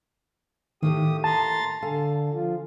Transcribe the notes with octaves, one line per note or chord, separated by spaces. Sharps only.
A2 D#3 A3 A#3 G4 D#6
A5 A#5 C6 A6
D3 A4 F5 G#5
F3 F4